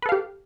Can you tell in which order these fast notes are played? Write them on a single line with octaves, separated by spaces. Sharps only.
B4 A4 F5 G4